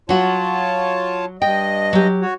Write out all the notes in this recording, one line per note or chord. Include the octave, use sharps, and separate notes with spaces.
F#3 F4 F#4 C#5 A5
G2 D#5 G5
F#3 G4
F#4 C#5